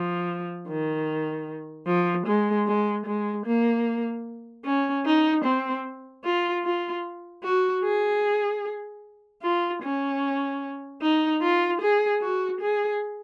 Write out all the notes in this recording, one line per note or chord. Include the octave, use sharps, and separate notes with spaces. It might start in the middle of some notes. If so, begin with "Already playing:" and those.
Already playing: F3
D#3
F3
G#3
G#3
G#3
A#3
C#4
D#4
C4
F4
F4
F#4
G#4
F4
C#4
D#4
F4
G#4
F#4
G#4